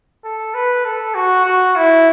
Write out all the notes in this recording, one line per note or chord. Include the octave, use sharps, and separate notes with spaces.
A4
B4
A4
F#4
F#4
E4